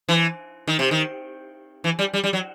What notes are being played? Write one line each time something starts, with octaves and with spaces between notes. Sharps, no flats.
E3
D#3
C3
D#3
E3
G3
G3
G3
F#3